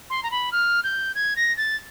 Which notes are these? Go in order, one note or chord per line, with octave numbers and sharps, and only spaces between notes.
C6
A#5
B5
F6
G6
G#6
A#6
A6